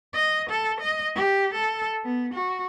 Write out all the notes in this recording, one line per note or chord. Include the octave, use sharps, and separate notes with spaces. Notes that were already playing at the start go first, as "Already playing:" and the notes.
D#5
A4
D#5
G4
A4
B3
F#4